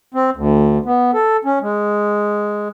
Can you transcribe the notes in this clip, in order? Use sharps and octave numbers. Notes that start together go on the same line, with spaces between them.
C4
D2
B3
A4
C#4
G#3